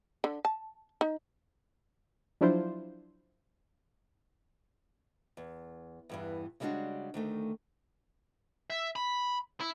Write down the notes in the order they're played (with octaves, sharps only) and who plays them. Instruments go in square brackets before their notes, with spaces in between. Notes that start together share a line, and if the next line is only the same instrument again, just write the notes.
[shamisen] D3
A5
D#4
[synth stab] F3 F#3 D4 E4 F4 C5
[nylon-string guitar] E2
E2 G2 E3
C#3 G3 G#3 B3 D4 F#4
D2 D#3 A3
[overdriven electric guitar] E5
B5
E4